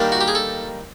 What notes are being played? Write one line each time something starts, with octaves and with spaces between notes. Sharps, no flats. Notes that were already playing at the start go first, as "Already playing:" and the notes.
Already playing: D#3 G3 A#3 D4
F#4
G4
G#4
A4